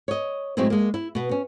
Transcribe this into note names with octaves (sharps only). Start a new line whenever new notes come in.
C#5 D#5
A2 F#3 G#3 C4 D#4 E4
G#3 A#3
E4
B2 B3
C#4